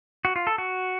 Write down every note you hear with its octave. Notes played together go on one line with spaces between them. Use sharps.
F#4
F4
A4
F#4